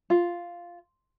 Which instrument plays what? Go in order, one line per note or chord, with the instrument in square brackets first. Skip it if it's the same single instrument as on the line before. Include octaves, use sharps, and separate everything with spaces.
[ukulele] F4